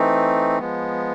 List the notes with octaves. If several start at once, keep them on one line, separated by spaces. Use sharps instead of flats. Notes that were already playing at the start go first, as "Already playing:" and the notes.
Already playing: E3 A3 C4 D#4
F3 G#3 B3